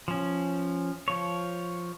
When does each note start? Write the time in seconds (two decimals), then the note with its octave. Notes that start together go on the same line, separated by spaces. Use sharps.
0.08 F3 C#4
1.08 F3 C#5